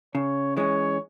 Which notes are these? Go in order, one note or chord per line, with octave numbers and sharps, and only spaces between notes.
C#3 C#5
E3 G#3 C#4 C#5